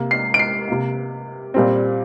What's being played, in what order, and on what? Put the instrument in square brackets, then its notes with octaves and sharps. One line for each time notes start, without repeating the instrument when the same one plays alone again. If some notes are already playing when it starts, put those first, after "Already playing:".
Already playing: [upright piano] C3 A#3
C7
D7
C7
C3 A#3
A#2 G3 C4